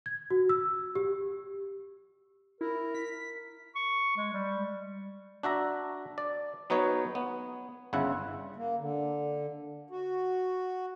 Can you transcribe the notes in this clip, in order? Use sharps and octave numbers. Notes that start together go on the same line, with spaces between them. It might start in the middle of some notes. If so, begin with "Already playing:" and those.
G#6
F#4
E6
G4
E4 A#4
B6
C#6
G#3
G3
D4 F#4 E5 A#5
D5
F#3 B3 D#4 B4 C#5
B3
G1 C#3 E4 F#5
A#3
D3
F#4